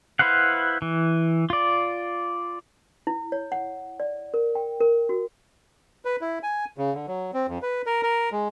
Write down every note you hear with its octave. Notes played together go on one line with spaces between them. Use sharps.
E4 B4 C5 F5 F#5
E3
F4 D5
E4
C#5
F#5
D5
A#4
G5
A#4
F#4
B4
E4
G#5
C#3
D3
F#3
C4
F2
B4
A#4
A#4
G#3